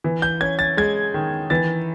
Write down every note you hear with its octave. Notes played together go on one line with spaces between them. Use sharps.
E3
G6
C#4 G#6
A6
G#3 G#6
D#3
E3 A6